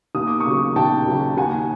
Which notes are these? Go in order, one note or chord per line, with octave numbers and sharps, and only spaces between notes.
D#2 D#6
D6
C#6 D#6
C#3 F#3
D#2 G5 A5
C#3 F#3
D#2 F#5 G#5